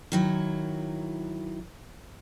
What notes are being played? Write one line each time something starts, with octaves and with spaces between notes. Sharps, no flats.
D#3 F#3 E4